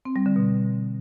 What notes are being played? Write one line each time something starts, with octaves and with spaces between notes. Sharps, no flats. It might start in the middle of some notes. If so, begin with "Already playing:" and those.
C4
G3
D3
B2